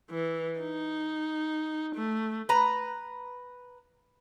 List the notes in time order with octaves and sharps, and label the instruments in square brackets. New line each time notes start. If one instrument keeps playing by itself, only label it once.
[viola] E3
D#4
A3
[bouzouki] B4 A#5